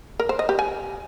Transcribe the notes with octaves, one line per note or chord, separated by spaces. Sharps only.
A#4
C5
D#5
G4
G#5